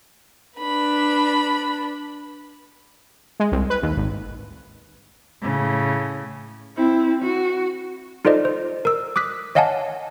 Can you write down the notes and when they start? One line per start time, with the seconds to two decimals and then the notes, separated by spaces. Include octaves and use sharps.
0.59 D4 B4 B5
3.40 G#3
3.52 C2
3.70 B4
3.83 D#2
3.97 G#1
5.42 A2 C#3
6.76 C4 E4
7.23 F#4
8.25 D#4 F4 A4 C5 D5 D#5
8.45 C5
8.85 A#4 E6
9.16 D6 D#6 F#6 B6
9.55 C#5 D#5 F5 F#5 G#5 A5